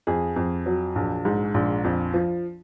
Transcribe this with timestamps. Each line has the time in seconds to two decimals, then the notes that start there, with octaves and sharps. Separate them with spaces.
0.07 F2 G#4
0.36 F2
0.66 F#3
0.96 A#1
1.25 G#2
1.54 A#1
1.84 F2
2.14 F3